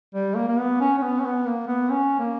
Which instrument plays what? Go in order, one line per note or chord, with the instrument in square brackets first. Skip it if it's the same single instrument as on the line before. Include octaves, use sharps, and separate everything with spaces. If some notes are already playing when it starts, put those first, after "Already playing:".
[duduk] G3
A#3
A#3
B3
C#4
C#4
B3
C#4
B3
A#3
B3
C#4
A#3